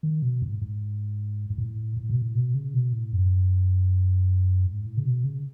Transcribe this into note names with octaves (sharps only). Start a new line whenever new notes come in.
D#3
B2
G#2
G#2
G#2
A2
A2
B2
A2
B2
C#3
B2
A2
F#2
G#2
A2
C#3
B2
C#3